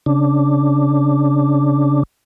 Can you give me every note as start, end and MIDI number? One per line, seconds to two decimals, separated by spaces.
0.06 2.03 49
0.06 2.03 62